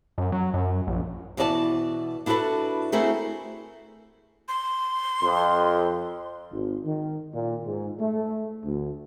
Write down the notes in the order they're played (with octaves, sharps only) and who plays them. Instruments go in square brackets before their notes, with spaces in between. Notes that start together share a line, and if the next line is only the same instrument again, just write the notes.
[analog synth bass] F#2
F#3
F#2
A#1
[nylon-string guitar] B2 E3 F#4 D5 E5 A5
D4 E4 F#4 G#4 A4 B4
A3 C4 E4 F#4 G#4 A#4
[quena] C6
[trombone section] F2
G#1
D#3
A#2
G#2
A3
D2